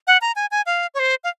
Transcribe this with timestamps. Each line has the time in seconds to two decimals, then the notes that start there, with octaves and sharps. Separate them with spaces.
0.07 F#5
0.22 A#5
0.36 G#5
0.51 G#5
0.66 F5
0.94 C#5
0.99 C5
1.24 F5